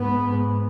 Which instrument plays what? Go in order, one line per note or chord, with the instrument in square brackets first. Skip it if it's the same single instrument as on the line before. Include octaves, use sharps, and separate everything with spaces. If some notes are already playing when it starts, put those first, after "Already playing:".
Already playing: [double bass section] G#2 B3